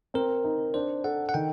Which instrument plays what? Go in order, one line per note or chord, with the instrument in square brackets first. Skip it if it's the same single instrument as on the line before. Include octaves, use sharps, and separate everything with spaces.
[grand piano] C4 [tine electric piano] A#4
[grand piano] D#4
[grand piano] D4 [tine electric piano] C5
[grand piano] A4 [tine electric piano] F#5
[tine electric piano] F#5
[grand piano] D#3 [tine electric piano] G5